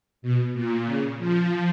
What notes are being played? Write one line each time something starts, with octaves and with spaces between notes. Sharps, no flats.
B2
A#2
C#3
F3